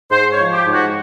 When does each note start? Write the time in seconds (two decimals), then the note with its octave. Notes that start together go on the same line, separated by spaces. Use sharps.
0.11 G#2 C5
0.32 C#5
0.39 F3
0.52 G4
0.66 G#2
0.72 F#4